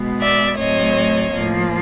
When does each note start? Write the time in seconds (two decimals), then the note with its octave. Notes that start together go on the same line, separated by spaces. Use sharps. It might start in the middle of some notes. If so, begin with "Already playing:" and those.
Already playing: B2 G#3 B3
0.21 D5 E5
0.58 A2 F#3 A3 C4 C#5 D#5
1.33 A2 F3 A#3